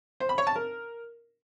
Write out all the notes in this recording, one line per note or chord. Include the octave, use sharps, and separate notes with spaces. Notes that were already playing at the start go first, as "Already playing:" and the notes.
C5
B5
C#5
A5
A#4